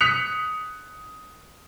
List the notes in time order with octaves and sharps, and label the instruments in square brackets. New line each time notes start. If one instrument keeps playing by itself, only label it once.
[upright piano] D#6 F#6 B6 C#7 F7